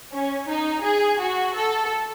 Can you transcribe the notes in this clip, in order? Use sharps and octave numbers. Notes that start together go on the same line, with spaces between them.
C#4
D#4
G#4
F#4
A4